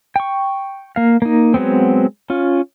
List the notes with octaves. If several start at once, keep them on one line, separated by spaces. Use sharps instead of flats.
G5 C#6
A#3 F5
A#3 D#4
F#3 G#3 B3 C4
C#4 F4